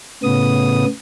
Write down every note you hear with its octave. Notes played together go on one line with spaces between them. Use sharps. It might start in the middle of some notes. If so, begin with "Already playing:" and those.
A2 C#3 B3 D#6